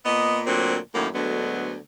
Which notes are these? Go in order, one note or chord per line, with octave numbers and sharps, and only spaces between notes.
A#2 B3 D#5
D2 A#2 F#3 C4
F#2 A2 D#3 F#3 A#3
D2 D3 F#3 G#3 B3